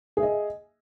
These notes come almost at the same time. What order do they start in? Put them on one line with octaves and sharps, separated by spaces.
G#4 E5 D#5